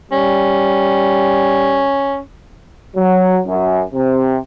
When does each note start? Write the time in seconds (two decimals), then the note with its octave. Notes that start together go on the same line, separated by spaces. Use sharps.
0.12 G3 C#4
2.96 F#3
3.47 F#2
3.93 C3